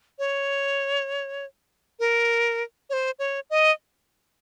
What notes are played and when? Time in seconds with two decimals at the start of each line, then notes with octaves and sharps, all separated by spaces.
0.19 C#5
2.00 A#4
2.90 C#5
2.93 C5
3.19 C#5
3.50 D#5